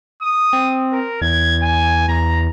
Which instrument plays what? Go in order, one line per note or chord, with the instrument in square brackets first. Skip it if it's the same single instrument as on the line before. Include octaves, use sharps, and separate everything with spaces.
[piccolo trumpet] D#6
[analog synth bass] C4
[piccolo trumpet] A#4
[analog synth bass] E2 [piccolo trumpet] G#6
[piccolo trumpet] G#5
[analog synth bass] E2 [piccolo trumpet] A#5